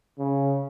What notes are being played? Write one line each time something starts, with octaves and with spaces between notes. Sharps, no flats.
C#3